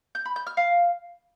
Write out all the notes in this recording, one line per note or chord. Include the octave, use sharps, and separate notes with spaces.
G6
B5
G6
F6
F5